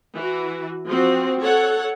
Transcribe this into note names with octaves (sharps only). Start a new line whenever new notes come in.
E3 F#4
F3 C4 F#4
A4 C#5 F#5